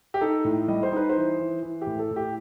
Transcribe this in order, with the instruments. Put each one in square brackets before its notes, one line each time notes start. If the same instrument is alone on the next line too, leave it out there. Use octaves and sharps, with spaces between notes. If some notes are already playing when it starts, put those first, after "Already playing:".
[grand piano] G4
D#4 A4
A2
G3 D#5
C5
D#4 B4
C5
E3
E3
E3
G4
A2
A4
A2
G4